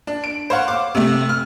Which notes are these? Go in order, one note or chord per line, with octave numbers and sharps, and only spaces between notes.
D4
D7
C5 C#5 F5 F#5
F5 D6
C3 A3
F6